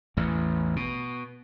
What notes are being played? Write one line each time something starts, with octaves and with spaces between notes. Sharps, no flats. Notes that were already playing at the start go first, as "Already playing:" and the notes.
A1 E2
B2